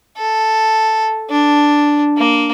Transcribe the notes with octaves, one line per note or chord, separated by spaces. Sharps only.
A4
D4
A#3